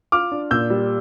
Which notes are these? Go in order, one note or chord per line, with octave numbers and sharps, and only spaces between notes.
F4 D6 F6
D4
A#2 E6 G6
G3